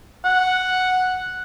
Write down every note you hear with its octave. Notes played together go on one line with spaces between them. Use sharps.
F#5